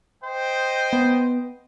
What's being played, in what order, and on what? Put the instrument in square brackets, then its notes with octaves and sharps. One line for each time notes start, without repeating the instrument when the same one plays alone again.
[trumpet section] C5 D#5 G5
[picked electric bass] B3